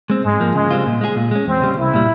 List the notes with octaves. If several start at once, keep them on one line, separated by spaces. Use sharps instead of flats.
G#3 C4
G#2 G#3
F3 A#3
C#3 G#3
G3 C4 F4
A#2
G#3 E4 G#4
A#2
G#3 C#4
E2 C4
C#3 G3
C2 E4
A#2 G3